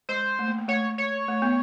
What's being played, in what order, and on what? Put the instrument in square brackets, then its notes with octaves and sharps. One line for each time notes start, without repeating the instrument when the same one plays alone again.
[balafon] G#3 [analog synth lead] C5
[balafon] A3
A#3
A#3
[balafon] A3 [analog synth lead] C#5
[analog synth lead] C#5
[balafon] A3
B3